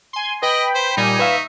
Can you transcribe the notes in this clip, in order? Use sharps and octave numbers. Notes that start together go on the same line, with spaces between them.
G#5 C6
B4 D#5 G5 B5
C5
A#2 G3 D#4 G#5
B4 E5 F5 C#6